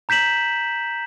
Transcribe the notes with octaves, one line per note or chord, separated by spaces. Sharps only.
A#5 G6 B6 E7 F#7